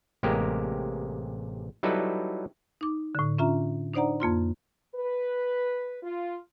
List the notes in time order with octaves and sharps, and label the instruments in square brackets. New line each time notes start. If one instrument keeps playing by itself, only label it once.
[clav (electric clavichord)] A1 C3 G#3 A#3 G4 A#4
F#3 G3 D#4 E4 A4 B4
[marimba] D#4 D6
A2 D3
C#4 D4 F4 E5 A#5
D4 D#4 C5 D5 F#5 A#5
F2 A#3 F4 C6
[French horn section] B4
F4